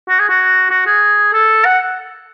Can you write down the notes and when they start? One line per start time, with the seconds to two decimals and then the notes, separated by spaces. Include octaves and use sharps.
0.09 F#4
0.20 G#4
0.29 F#4
0.70 F#4
0.86 G#4
1.33 A4
1.65 F#5